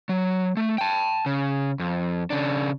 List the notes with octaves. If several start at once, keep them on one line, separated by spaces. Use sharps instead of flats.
F#3
A3
G5 A5
C#3
F2
C#3 D4